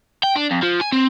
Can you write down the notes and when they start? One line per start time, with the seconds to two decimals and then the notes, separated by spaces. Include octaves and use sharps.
0.23 G5
0.36 D4
0.51 F2
0.63 F3
0.81 G#5
0.92 C4